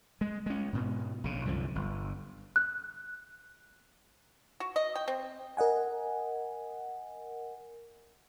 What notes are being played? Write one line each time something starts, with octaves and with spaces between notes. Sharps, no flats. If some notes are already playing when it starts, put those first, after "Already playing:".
G#3
G#3 C#4
G#2 B2
A#1 C#3
C2 F#2 D3 F3
G1
F#6
F#4
D#5
G5
C4
A#4 D#5 F#5 G#5